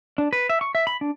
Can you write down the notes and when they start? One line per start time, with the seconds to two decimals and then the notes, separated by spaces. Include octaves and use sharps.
0.18 D4
0.33 B4
0.49 E5
0.61 C#6
0.75 E5
0.87 B5
1.01 D4